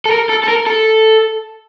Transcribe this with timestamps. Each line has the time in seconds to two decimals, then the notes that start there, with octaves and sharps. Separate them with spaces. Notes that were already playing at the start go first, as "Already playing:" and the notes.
0.06 A4
0.11 A#4
0.29 A4
0.44 A4
0.49 A#4
0.67 A4